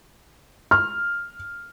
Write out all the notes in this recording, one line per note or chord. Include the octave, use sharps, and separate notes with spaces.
F6